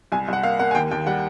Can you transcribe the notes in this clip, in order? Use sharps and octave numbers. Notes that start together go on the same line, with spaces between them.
C2 G#5
C2 F#5
A#3 F5
A#3 F#5
G#5
D#2 G5
D#2 G5
G3 F#5